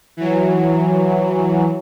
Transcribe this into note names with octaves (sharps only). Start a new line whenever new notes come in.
E3 F#3